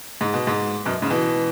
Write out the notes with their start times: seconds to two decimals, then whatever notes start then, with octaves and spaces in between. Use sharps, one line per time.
0.21 G#2
0.34 B2
0.47 G#2
0.86 F#2 B2
1.02 G#2 C#3
1.10 B2 E3